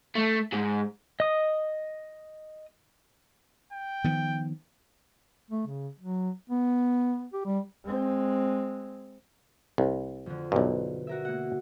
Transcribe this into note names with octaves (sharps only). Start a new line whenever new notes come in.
A3
G#2
D#5 D#6
G5
D#3 F3 B3
A3
C#3
F#3
B3
G4
G3
G#3 C4
C2
F2 D3
B1 G2 B2
F#4 A#4 E5
A#3 F#5